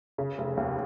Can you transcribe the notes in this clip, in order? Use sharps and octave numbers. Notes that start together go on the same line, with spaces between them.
C#3
F1
D#2